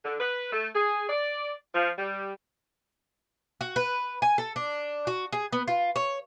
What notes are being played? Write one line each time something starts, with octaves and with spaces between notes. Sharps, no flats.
D3
B4
A3
G#4
D5
F3
G3
F#4
B4
G#5
A4
D4
F#4
G#4
B3
F4
C#5